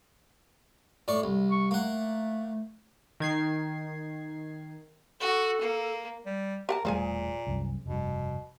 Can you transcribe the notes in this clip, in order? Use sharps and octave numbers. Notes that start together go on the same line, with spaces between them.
A2 D5 C#6
C2
C#6
A3 A#3 F#5
D#3 G#6 C7
F#4 A4
A#3
G3
G4 A#4 F#5 A5
E1 A#2 F3 G3 A3 G#4 G#5
C2 F#2
F1 G2 B2